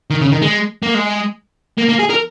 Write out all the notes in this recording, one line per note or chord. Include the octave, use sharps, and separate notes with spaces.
D#3
C#3
D#3
G#3
A#3
G#3
A#3
A#3
G#4
A#4